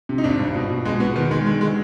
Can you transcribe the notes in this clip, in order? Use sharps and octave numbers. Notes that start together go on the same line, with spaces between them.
C3
D#4
G#1 D4
G2
B2
B2
B2 G#3
B2 B3
D#3 B3
D#3 G#3
D3 G#3
D3 G#3